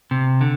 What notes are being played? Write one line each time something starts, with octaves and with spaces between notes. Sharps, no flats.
C3
D3